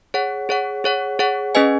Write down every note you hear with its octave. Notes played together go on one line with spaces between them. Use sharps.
G#4 C#5 F#5
G#4 C#5 F#5
G#4 C#5 F#5
G#4 C#5 F#5
C#4 G#4 B4 D#5 G#5